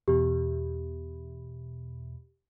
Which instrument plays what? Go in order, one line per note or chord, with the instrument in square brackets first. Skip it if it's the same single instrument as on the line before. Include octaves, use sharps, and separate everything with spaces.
[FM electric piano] E2 B2 [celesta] G4